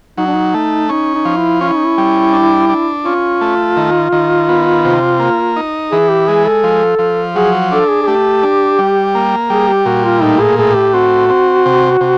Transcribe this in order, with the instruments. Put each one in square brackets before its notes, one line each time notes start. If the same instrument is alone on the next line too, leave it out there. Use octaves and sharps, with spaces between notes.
[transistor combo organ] F#3 [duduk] D#4
[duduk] D4
D#4
[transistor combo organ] A3
[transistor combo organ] C#4 [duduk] D#4
[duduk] D#4
[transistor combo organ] F3
[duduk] E4
[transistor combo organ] C#4 [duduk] F4
[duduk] E4
D#4
E4
[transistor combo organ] G3
D4
D4
[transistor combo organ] C#4 [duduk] F4
[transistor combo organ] A3
D#3
D#3
B3
C3
A#3
D#4
[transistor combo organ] E3 [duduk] G#4
[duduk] G4
[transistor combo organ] G#3 [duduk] G#4
[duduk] A4
[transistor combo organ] F3
F3
[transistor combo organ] F#3 [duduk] G#4
[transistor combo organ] D4 [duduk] A4
[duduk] G#4
G#4
[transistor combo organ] A3 [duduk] G4
[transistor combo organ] D4
G3
A#3
[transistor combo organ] G3 [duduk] G#4
[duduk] G4
[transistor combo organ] A#2 [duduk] F#4
[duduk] F4
[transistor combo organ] A2 [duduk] D#4
[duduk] G#4
[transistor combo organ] A2 [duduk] G#4
[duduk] G4
[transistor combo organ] C4 [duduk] F#4
[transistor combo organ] C4
C3
C3